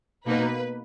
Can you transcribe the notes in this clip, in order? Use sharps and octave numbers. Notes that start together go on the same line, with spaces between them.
B2 A#3 D#4 B4